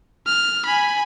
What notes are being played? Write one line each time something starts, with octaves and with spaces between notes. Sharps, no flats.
F6
G#5 B5